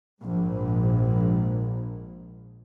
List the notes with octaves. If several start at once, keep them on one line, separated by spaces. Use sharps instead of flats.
A#1 G#2